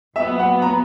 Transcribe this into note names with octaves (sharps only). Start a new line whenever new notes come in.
A#2 F#3 B3 E5
F#5
A#5